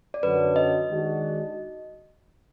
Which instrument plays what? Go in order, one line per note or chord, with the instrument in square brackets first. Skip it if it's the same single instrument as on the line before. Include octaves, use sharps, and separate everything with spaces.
[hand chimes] D5
[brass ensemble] F#2 D3 F#3 [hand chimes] B4
[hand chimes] D#5
[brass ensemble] D#3 G#3 D4 F#4